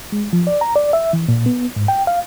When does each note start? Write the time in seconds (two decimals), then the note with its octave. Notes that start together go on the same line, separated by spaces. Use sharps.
0.12 G#3
0.33 F3
0.47 D5
0.61 A#5
0.76 D5
0.93 E5
1.13 E3
1.28 A#2
1.46 B3
1.76 G#2
1.88 G5
2.07 F5